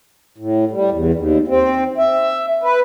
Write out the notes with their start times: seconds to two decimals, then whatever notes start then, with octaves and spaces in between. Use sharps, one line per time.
0.38 A2
0.71 G3
0.91 E2
1.14 D#2
1.48 C4
1.98 E5
2.63 B4